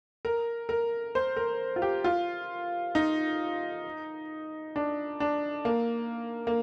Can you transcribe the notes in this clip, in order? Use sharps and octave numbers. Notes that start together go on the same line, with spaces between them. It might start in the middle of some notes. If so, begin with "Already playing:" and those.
A#4
A#4
C5
A#4
F4
G4
F4
D#4
D4
D4
A#3
A#3